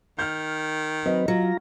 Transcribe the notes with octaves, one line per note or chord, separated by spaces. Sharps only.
D#3 F6 G6
F#3 C4 B4 D#5
F#3 F4 A#5